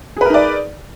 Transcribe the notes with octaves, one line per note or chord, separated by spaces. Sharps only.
D#4 G#4 A#4 B4 D5